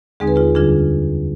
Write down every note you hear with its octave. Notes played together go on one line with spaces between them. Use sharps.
D#2 D3 G#3 C4 D#4 G#4
B4
F4 G#4
F2 D3 G3 D4 F4 G#4